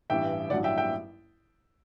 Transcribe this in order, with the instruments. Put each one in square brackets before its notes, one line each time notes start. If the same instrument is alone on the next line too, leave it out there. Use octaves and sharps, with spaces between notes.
[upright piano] A1 G2 E3 G3 E5 G5
A1 G2 F#3 D5 F#5
E5 G5
E5 G5